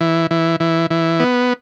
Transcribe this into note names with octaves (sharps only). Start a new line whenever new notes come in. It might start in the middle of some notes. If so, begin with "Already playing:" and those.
E3
E3
E3
E3
B3